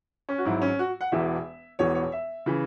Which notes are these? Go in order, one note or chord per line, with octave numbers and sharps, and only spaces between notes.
C#4
F#4
G#1 G#2 F#3 E4
C#4
F#4
F#5
E1 E2 E3 E5
E1 E2 E3 C#5
C#5
E5
C#3 E3